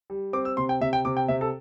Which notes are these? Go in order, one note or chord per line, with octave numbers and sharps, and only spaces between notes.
G3
C4 D6
E6
C3 C6
G5
C3 E5
G5
C3 D6
G5
C3 E5
A4